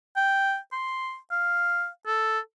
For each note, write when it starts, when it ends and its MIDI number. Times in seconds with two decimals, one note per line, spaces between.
0.16 0.58 79
0.72 1.17 84
1.31 1.88 77
2.07 2.39 69